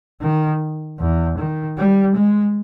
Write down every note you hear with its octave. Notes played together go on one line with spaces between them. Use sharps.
D#3
E2
D#3
G3
G#3